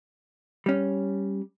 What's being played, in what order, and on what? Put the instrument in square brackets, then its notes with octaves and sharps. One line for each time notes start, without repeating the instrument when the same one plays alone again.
[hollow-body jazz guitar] G3 C#4